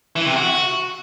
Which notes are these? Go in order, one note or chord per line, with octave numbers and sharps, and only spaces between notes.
E3
C3
F#4